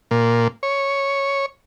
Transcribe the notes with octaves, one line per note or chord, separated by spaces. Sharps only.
A#2
C#5